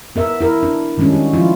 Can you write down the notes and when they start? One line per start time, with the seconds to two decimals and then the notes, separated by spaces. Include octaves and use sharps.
0.16 B3 A#4 E5
0.41 E4 A#4
0.63 D4
0.98 D#3 G3 G#3 C#4 D4
1.13 F#4
1.33 F3 E4 F4